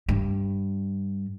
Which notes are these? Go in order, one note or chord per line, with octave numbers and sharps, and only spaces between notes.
G2